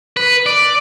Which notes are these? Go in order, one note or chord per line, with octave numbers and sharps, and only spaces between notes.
B4
D5